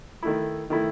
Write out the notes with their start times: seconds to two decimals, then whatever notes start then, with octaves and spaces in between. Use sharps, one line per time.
0.23 D#3 A3 E4
0.70 D#3 A3 E4